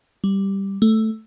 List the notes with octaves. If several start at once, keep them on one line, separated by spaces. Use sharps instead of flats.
G3
A3